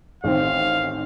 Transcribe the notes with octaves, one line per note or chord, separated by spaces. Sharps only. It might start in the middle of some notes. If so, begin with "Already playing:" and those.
A1 D#3 C4 F5